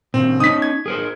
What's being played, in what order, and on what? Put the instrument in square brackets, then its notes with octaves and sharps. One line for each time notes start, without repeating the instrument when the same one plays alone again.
[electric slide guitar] A#2 C#3 [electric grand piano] C4
[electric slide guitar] C#4 D#4 [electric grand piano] D#6 B6
[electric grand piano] G#6
[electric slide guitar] G#4 A#4 C5